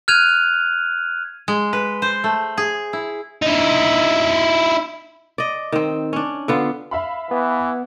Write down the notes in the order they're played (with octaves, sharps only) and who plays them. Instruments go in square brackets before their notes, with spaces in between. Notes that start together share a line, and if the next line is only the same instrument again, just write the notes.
[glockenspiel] F6 F#6 G#6 D#7 F7
[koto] G#3
B4
C5
A3
G#4
E4
[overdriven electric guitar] D#4 E4
[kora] D5 D#5
D#3 C4
C#4 D4
D3 B3 F4
[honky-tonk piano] E5 F5 B5
[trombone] E3 [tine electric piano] B3